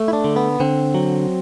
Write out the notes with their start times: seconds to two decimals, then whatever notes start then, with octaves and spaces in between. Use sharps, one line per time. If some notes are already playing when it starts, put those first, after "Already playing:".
Already playing: A3
0.08 E4
0.13 D4
0.24 D3
0.36 B3
0.60 D3 C4
0.94 F#3